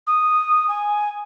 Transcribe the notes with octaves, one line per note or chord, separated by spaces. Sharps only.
D#6
G#5